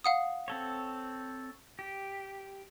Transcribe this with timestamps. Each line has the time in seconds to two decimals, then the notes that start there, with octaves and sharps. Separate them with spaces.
0.04 F5 F#5 D#6
0.48 C4 A4 C#5
1.79 G4